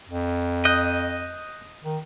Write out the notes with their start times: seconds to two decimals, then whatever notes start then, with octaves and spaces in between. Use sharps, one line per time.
0.09 F2
0.65 D#5 D#6 F#6 G6
1.85 D#3